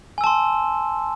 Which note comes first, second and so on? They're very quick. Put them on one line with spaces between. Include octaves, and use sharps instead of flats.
G#5 E6 A5 C6